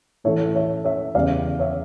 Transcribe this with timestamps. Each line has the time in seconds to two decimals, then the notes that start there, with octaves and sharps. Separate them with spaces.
0.24 A2 E3 A3 C#5 E5
0.55 C#5 E5
0.84 C#5 E5
1.15 E2 C#3 G3 D5 F5
1.59 C#5 E5